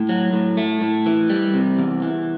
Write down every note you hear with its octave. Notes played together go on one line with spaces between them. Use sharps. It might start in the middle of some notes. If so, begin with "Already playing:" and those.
Already playing: A2
F#3
A2
A3
A2
E3
G3
C3
E2
E3